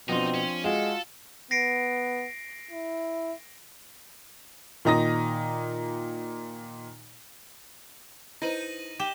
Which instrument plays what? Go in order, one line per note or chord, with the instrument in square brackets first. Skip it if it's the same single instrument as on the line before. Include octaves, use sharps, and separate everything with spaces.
[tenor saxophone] B2 [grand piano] F3 C4 D4 [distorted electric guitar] D#4 [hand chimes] G5 C6
[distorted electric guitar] C#4
[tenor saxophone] G#3 [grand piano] F4 F#4 [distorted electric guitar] A4 [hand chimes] F5
[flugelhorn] B3 [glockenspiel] A#6 C7 D7
[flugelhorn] E4
[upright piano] A#2 D#3 D#4 A#5 D#6 A#6
[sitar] D#4 [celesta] E4 B4 C5 [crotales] A#6 D#7 F#7
[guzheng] G4 [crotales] E7 G7